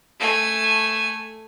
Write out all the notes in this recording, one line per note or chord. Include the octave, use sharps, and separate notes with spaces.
A3 G#5